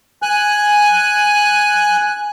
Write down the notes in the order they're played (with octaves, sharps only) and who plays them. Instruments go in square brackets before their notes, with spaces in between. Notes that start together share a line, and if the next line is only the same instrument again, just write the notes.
[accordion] G#5 F#6